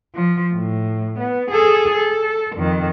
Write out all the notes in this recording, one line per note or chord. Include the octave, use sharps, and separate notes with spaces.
F3
A2
B3
G#4 A4
A4
F2 D#3